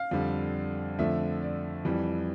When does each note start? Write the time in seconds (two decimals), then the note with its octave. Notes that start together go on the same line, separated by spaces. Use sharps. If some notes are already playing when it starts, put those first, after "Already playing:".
Already playing: F5
0.11 F2 D3 G3
0.99 F2 D3 F3 A3 E5
1.42 D5
1.85 F2 E3 G3